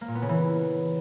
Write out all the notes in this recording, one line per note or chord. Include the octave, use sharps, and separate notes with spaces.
A#3
A#2
B3
C#3
E3